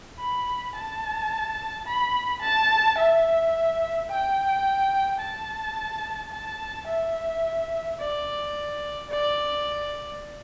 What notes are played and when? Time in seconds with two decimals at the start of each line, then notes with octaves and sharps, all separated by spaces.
0.19 B5
0.75 A5
1.86 B5
2.42 A5
2.98 E5
4.10 G5
5.20 A5
6.31 A5
6.88 E5
7.98 D5
9.10 D5